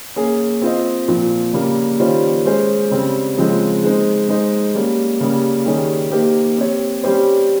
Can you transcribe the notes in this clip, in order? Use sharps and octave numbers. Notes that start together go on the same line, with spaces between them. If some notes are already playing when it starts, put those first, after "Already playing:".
A#3 C#4 G#4
C4 F4 C5 D#5
A#2 F3 C4
C#3 G3 A#3
D#3 G3 C#4 F4 C5
G#3 C#4 G#4 C5
C#3 G3 C4
C#3 F3 G#3 C4
G#3 D#4 G#4 C5
G#3 D#4 G#4 C5 D#5
G3 A#3 C#4
C#3 G3 A#3
D#3 G3 C#4 G#4
A#3 D#4 G4 C5
C4 G4 C#5
G3 C#4 G4 C5